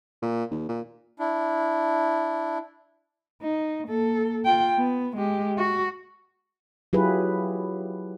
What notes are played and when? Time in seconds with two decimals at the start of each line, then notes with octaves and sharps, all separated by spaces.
0.22 A#2
0.51 D#2
0.69 A#2
1.19 D4 E4
3.42 D#4
3.88 A#3 A4
4.45 F4 G5
4.78 B3
5.17 G#3 G4
5.58 F#4
6.93 F#3 E4 F4 G4 G#4 B4